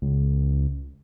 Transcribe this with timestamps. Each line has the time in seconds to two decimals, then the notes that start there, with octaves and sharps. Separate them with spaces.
0.02 C#2